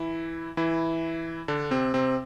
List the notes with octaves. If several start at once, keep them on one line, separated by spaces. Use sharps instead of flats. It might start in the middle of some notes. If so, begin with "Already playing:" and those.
Already playing: E3 E4
E3 E4
D3 D4
C3 C4
C3 C4